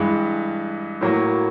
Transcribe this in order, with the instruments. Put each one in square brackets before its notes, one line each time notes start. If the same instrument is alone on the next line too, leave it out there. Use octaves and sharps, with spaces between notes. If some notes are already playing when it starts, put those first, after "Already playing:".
Already playing: [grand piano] G2 E3 G#3
A2 F#3 A#3